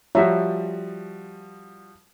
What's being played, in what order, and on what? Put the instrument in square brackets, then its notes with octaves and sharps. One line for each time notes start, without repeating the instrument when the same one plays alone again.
[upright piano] F3 G3 F#4 [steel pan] C#5 E5 A#5